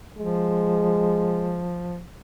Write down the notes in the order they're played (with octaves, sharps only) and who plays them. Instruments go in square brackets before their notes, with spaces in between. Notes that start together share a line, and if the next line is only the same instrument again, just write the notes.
[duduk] F3 [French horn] G#3